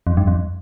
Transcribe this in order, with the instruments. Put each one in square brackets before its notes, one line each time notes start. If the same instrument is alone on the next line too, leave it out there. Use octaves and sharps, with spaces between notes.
[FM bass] F2
G2
F2